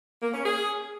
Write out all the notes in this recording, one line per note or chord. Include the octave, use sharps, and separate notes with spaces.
A#3
C#4
G#4